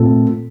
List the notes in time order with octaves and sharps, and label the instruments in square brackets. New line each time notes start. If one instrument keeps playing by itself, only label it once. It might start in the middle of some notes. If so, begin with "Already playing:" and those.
Already playing: [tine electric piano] A#2 A3 C4 F4 A4